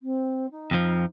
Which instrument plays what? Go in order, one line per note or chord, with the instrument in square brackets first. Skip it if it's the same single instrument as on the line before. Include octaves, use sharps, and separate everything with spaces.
[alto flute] C4
D#4
[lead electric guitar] F2 F3